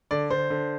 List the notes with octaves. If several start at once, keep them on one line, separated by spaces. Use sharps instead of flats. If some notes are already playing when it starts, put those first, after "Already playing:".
D3 D5
D3 C5
D3